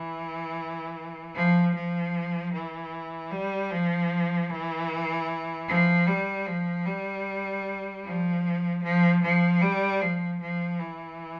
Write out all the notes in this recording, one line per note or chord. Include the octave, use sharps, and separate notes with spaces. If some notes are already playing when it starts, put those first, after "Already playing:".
Already playing: E3
F3
F3
E3
G3
F3
E3
F3
G3
F3
G3
F3
F3
F3
G3
F3
F3
E3